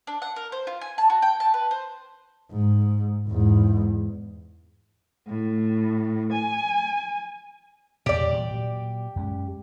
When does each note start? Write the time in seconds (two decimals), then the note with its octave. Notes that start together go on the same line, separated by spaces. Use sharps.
0.07 D4
0.22 F#5
0.36 A#4
0.52 C5
0.67 F4
0.81 G#5
0.98 A5
1.10 F#4
1.22 G5
1.40 A5
1.54 B4
1.71 C5
2.52 G#2
3.28 E2 G#2
5.28 A2
6.31 G#5
8.06 E2 A#2 G4 D5
8.28 A#2 E3 G3
8.50 A#2 F#3
9.16 F#2 G#3 C#4